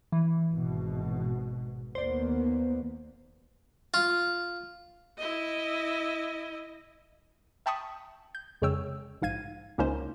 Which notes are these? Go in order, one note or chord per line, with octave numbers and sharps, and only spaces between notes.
E3
G#1 B2
D#2 A#3 B3 C5 D5
F4
E4 D#5
E5 G5 A5 B5 C#6 D#6
G6
F2 C#3 G#3 C#5 G5 E6
A#1 G#2 F5 G#6 D#7
C#2 A#3 C#4 D#4 C5